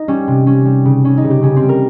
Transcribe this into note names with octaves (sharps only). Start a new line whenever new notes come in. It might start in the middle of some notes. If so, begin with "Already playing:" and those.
Already playing: D#4
G3 C#4
C3
G3 C#4
G3
C#3
G3 C#4
D#4
C#3
G4
C#3 C#4
C4
G3
A#4